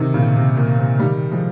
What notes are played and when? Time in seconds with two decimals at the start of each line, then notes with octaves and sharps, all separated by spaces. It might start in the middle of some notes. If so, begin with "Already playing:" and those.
Already playing: C3 D#3
0.14 A#2 C#3
0.36 C3
0.57 A#2
0.78 C3
0.99 D#3 G3
1.31 F3 G#3